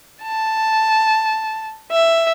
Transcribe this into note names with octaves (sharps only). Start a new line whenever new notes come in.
A5
E5